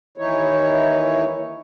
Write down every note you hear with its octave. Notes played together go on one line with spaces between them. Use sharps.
D#2 E3 D#4 E4 C#5